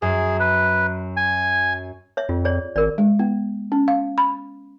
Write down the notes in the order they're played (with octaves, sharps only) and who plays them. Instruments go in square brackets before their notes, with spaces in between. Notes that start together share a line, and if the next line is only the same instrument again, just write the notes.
[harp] F#2 [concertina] G#4
[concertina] B4
G#5
[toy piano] C#5 E5
[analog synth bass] F2 [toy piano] F4
[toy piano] G#4 C#5 D5
[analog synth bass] G#1 [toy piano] G#4 A#4 D5
[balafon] G#3
B3
C#4
F5
B5